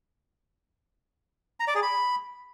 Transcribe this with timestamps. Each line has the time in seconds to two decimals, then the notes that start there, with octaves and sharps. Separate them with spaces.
1.60 A#5
1.68 D5
1.75 G#4
1.83 B5